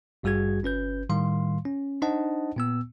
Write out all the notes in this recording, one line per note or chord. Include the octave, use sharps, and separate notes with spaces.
G#1 G2 G3 F#4 G#4 G#6
G1 C#4 B4 G6
A2 D#3 G3 F5 C6
C#4
D4 D#4 C5 D#5 F#5 A5
A#2 B3 E6